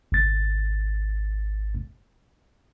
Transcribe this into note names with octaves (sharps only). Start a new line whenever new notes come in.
G#1 A6